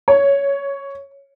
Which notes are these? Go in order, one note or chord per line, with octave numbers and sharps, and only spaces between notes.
C#5